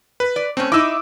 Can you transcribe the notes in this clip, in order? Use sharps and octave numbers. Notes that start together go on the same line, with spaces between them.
B4
D5
A3 C4 C#4
D#4 E4 D6 E6